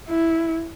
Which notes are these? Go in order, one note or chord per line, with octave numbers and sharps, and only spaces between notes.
E4